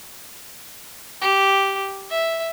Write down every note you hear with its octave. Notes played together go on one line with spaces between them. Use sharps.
G4
E5